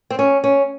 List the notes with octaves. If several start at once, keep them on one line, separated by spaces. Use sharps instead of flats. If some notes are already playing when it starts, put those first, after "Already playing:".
C4
C#4
C#4